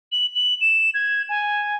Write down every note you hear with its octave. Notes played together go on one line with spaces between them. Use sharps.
F#7
F#7
E7
G#6
G#5